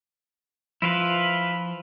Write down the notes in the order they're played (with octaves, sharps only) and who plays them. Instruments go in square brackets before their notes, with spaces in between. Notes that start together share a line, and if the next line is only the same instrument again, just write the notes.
[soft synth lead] F3 [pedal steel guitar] E4 F4 B4